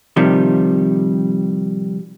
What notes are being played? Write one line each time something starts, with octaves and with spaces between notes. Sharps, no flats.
C3 D#3 F3 G3